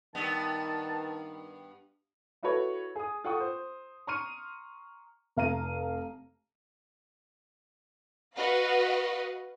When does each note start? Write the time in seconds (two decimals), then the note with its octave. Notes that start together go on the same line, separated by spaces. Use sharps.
0.15 G2 D#3 B3 A5
2.43 E4 F#4 A4 B4 C#5
2.96 G#4 D#6
3.24 F4 A4 F#5 G5 C#6 D#6
3.40 C5
4.07 A#5 C6 C#6 F6 C#7 D#7
5.37 F1 F5 A#5 D#7
8.37 F#4 B4 D#5 F5